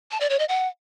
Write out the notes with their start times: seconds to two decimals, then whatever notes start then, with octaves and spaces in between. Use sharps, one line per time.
0.11 A5
0.20 D5
0.30 C#5
0.39 D#5
0.48 F#5